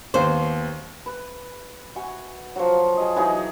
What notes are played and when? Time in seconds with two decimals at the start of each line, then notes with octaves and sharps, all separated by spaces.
0.14 D#2 B3 C5
1.06 B4
1.96 F#4 G#5
2.56 F3 F#3
2.97 G#4 D#5
3.16 E3 F#3 D#4 G#4